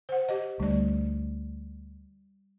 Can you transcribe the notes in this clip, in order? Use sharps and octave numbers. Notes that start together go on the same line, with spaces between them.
C5 F#5
G4 D#5
D2 G3 D5